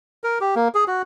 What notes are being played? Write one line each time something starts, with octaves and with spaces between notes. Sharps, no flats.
A#4
G4
A#3
G#4
F#4